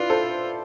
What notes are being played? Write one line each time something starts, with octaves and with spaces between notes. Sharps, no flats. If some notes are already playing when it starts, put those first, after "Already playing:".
Already playing: E4 F4 B4 D5
A4 C5